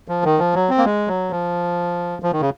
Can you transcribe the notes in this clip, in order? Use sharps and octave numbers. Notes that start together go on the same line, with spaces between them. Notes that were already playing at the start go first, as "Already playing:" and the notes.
F3
D#3
F3
F#3
C4
A#3
G#3
F#3
F3
F3
D#3
C#3